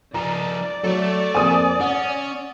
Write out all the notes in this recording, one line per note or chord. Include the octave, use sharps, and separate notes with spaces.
F3 D#4 D5 A#5
F#3 A3 A4
F2 A#3 C5 G#5 D#6
C#4 F#5